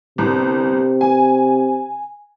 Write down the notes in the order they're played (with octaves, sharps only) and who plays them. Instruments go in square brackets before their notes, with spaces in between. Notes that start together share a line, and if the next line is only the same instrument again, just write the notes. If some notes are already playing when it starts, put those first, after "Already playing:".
[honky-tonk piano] G1 C2 [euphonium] C3
[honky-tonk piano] G#5